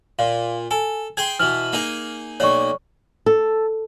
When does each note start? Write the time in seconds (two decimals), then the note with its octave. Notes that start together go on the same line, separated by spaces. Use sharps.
0.19 A#2 F5
0.71 A4 G#5
1.17 G#4 G5 C6 G#6
1.40 B2 E3 F6
1.73 A#3 D#4 G#4
2.40 B1 A#3 C#5 D5 C#6
3.26 A4